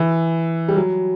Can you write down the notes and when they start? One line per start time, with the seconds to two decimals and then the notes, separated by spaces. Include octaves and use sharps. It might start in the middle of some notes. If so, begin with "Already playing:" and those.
Already playing: E3
0.68 G3
0.76 F#3